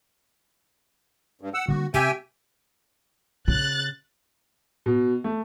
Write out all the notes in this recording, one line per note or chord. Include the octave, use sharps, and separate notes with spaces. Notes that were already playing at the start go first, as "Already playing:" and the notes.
G2
F#5 E6
D3 G3 A#3 F#4
C3 C4 G4 E5 G5 G#5
C#3 F#6 A6
B2
A3